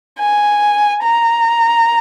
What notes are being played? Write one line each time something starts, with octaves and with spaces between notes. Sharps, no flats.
G#5
A#5